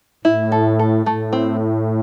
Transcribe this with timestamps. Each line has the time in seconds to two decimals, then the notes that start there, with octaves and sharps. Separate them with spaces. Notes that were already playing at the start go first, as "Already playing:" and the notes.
0.25 A2 E4
0.52 A4
0.79 A4
1.06 A2 A3
1.33 C4